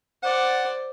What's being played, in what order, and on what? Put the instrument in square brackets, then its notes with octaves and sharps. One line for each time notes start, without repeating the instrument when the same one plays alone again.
[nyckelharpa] C5 D5 [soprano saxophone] F#5